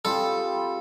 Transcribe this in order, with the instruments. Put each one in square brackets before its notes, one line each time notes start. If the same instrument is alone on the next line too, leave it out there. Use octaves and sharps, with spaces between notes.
[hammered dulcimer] G3 C4 F4 G#4 [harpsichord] A4